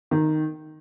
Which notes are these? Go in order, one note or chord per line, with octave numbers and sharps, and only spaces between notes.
D#3